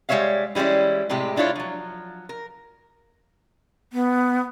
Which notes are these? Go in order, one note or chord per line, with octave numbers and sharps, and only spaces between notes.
G3 G#3 B4 C#5 E5 F5
E3 G3 G#3 C#4 E4
A2 C3 G#3 G4
G#3 D4 E4 F4 C#5
F3 F#3
A#4
B3